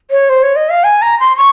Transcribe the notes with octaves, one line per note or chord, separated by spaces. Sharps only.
C#5
C5
C#5
D#5
F5
G#5
A#5
C6
C#6